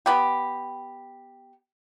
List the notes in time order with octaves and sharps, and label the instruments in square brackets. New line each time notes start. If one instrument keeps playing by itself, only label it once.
[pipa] B3 G4